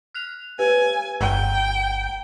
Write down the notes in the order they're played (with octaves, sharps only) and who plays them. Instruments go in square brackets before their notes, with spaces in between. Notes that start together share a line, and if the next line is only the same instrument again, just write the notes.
[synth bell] F6 F#6 F7
[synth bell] G4 B4 [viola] G#5
[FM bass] G1 [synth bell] F#5 A#5 [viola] G5